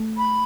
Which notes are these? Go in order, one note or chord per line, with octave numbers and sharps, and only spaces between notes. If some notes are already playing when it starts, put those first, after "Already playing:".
Already playing: A3
B5